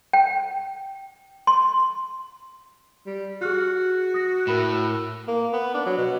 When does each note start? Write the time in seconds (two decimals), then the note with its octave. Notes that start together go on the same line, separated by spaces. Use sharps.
0.13 G5
1.47 C6
3.06 G3
3.42 F#4 G#4 F6 F#6
4.14 D#6 A#6
4.47 A2 A#4 B5 E7
5.28 A#3
5.53 B3
5.74 D4
5.86 F#3
5.97 B2